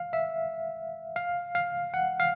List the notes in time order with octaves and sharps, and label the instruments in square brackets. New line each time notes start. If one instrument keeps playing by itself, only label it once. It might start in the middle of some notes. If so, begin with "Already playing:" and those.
Already playing: [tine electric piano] F5
E5
F5
F5
F#5
F5